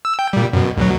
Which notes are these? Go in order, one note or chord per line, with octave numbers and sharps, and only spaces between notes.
E6
G5
A#2 G3
F#2 B2
D2 B2 F#3